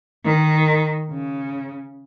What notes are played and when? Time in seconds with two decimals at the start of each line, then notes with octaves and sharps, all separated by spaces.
0.25 D#3
1.11 C#3